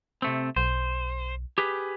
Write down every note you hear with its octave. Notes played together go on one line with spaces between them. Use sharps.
C3 A3 C4
B1 C5
G4 G#4 B4